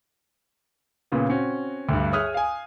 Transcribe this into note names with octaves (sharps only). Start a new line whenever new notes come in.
A#2 C#3 B3
C4 C#4 F#4
D2 G2
G#4 C#5 E5 D#6 F6 F#6
F5 G#5